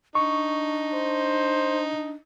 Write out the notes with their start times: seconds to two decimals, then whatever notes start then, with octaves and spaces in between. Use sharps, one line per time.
0.15 D4 D#4 C#6
0.93 C5